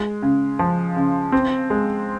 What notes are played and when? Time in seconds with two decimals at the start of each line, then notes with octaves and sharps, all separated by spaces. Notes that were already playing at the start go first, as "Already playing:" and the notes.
Already playing: G#3
0.22 C#3
0.59 F3
0.96 C#3
1.32 C4
1.70 G#3